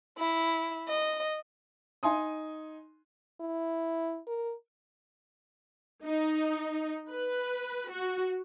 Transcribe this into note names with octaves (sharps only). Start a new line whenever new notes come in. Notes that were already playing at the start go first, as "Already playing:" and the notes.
E4
D#5
D#4 G#5 C6 D#6
E4
A#4
D#4
B4
F#4